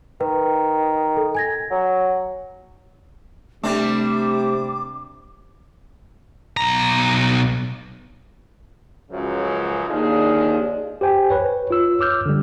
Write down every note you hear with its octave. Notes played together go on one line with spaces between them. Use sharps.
D#3 B4
A4
G#5 G#6 A#6
F#3
C3 G3 A3 C4 D4 D6
B1 A#5
C#2 F#2 C#3 F3 F#3
D#2 F3 G#3 D4 D#4 G#4
G4 C5 G5 G#5
B4 C#5
F4 C#5 E6
D6 E6 F6 G6
D3 G3